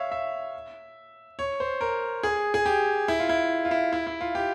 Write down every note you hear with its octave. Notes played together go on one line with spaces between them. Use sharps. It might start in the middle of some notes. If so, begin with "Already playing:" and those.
Already playing: C#5 E5 F5
E5
C#5
C5
A#4
G#4
G#4
G4
E4
F4
E4
F4
E4
E4
E4
F4
G4